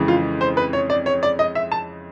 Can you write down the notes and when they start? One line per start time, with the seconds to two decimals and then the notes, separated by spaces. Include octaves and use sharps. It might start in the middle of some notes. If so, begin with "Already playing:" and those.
Already playing: F2 C#3 E3 G#3
0.08 F4
0.41 C5
0.57 B4
0.73 C#5
0.90 D5
1.06 C#5
1.23 D5
1.39 D#5
1.55 E5
1.72 A5